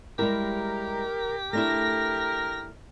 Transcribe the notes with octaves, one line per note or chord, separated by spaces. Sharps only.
G3 G#3 E4 G4 A#4
A3 D4 E4 A#4 A#6